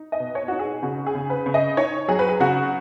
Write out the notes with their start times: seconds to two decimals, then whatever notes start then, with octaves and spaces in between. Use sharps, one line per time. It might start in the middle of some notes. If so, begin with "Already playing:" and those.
Already playing: D#4
0.12 D#5
0.20 B2
0.35 C#5
0.48 D#4 F#4
0.59 G#4
0.82 C#3 F#4
1.06 G#4
1.15 C#3
1.30 B4
1.46 C#3
1.54 D#5
1.77 D#4 C#5
2.08 F#3 G#4
2.19 B4
2.29 G#4
2.40 C#3 F#4